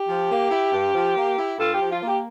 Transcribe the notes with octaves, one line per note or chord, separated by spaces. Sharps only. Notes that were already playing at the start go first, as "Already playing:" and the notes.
Already playing: G4
F3
A#3
E4
G2
F3
A#3
E4
G2 F4 A4
G4
F3
F4
A#3
G4